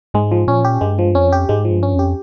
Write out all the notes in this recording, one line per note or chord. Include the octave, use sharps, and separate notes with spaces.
G#2 G#3
F3
A#2 C#4
G4
G2 G#3
F3
F2 C#4
G4
G#2 G#3
F3
G2
C#4
F2
G4